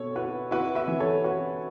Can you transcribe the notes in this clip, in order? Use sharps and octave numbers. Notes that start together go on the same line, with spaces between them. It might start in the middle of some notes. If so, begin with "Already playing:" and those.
Already playing: B2 A4 C#5
E4 F#4 B4
E4 F#4 B4
B4 E5
E3
A4 C#5
C#4 F#4 B4